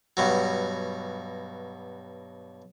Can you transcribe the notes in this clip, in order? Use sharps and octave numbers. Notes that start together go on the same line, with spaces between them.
G2 B2 F#3